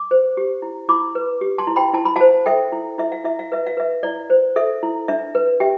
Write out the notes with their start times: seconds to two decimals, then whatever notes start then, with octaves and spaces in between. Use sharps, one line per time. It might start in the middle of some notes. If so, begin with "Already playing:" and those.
Already playing: D6
0.11 C5
0.37 G4
0.62 E4
0.89 E4 B5 D6
1.15 B4
1.41 G4
1.58 A5 C6
1.67 E4
1.76 G5 B5
1.94 E4 A5
2.05 B5
2.16 C5 F5 A5
2.46 A4 E5 G5
2.72 E4
2.98 E4 E5
3.12 F5
3.24 E4 E5
3.39 F5
3.52 B4 E5
3.66 F5
3.77 B4 E5
4.03 E4 D5
4.30 C5
4.56 A4 E5
4.83 E4
5.08 D4 E5
5.35 B4
5.60 G4 E5 G5